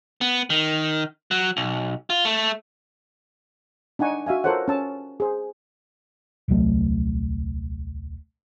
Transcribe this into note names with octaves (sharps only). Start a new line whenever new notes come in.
B3
D#3
F#3
B1
F4
A3
D4 D#4 F#5 G#5 C#6
F#4 E5 F5 G#5
F4 A4 A#4 C5 C#5 F#5
C#4 A5 E6
G#4 C5
D#1 C2 F#3 A3